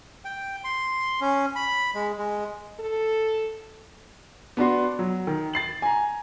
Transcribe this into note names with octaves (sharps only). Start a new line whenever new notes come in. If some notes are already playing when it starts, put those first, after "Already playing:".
G5
C6
C#4
B5
G#3
G#3
A4
B3 D4 F#4 C6
F#3
D#3
A6 C7 F#7
G#5 A#5